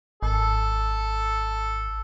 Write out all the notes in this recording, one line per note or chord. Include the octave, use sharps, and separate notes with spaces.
G#1 A4